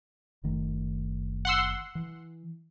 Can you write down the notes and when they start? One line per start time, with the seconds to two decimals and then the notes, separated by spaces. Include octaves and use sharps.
0.44 F#1 D#3 A3
1.45 F#5 C6 E6
1.95 E3